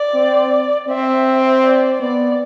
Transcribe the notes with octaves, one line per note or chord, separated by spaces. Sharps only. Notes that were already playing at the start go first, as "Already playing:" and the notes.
Already playing: D5
C4
C4 E5
D5
B3 D5